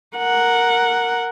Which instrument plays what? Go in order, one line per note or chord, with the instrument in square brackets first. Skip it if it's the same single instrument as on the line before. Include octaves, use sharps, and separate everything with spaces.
[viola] A#4 F#5